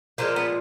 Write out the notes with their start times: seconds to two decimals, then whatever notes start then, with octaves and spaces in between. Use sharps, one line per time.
0.18 A#2 F3 G#3 A#3
0.36 B3